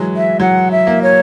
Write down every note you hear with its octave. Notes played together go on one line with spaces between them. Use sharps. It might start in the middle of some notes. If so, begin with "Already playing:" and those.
Already playing: E3 F#3 G#3
E5
F#3 F#5
E5
A#3
C#5